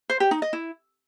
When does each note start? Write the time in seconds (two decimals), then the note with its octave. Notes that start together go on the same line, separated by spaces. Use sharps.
0.10 C5
0.20 G4
0.31 D#4
0.42 D#5
0.53 E4